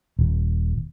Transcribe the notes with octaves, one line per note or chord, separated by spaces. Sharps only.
D#1